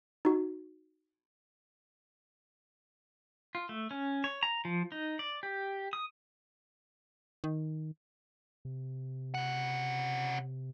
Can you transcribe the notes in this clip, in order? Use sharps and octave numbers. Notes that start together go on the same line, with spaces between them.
D#4 F#4
F4
A3
C#4
C#5
A#5
F3
D#4
D5
G4
D#6
D#3
C3
C#3 F#5